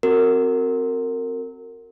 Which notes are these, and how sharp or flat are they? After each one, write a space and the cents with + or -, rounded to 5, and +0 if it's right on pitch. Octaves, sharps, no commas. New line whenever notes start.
C4 +0 F#4 +0 A#4 -30